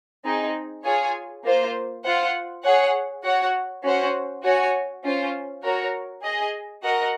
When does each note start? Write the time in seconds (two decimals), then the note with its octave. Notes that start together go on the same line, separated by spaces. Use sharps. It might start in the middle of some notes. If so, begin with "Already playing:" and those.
0.24 C4 D#4 G#4
0.84 F4 G#4 C#5 G#5
1.44 A#3 F4 C5
2.04 F4 C5 F#5
2.64 G#4 C#5 F#5
3.24 F#4 C#5 F#5
3.84 C#4 F#4 C5 F#5
4.43 F#4 C#5 G#5
5.03 C#4 F4 C5
5.63 F#4 A#4 C#5
6.23 G#4 D#5 G#5
6.83 F#4 A#4 D#5 F#5